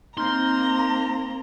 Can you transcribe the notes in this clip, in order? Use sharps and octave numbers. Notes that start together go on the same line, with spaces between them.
A#3 C4 D#4 A#5 C6 F6 G6